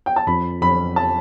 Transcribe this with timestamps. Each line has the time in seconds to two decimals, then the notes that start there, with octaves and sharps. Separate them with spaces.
0.06 G5
0.16 A5
0.27 F2 B5
0.61 F2 B5
0.96 A5